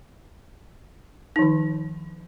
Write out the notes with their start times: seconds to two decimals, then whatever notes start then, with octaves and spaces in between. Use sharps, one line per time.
1.36 D#4
1.39 F3
1.42 D#3